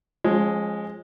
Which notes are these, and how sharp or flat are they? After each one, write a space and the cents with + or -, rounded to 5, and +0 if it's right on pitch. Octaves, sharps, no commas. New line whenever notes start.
F3 +5 G#3 +0 C#4 -30